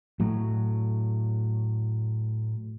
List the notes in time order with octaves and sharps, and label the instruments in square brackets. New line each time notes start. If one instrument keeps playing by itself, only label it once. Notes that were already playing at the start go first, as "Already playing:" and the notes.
[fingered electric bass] A2 F#3